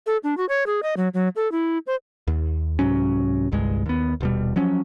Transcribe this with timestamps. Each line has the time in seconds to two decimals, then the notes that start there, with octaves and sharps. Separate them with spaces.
0.06 A4
0.24 D4
0.37 F#4
0.49 C#5
0.66 G#4
0.83 D#5
0.97 F#3
1.14 F#3
1.36 A4
1.52 E4
1.87 C5
2.27 D#2
2.79 C2 G#2 F#3 C#4
3.52 G1 C2 G2 G#3
3.86 D#2 B3
4.20 D#1 B2 G3
4.56 F3 F#3 C#4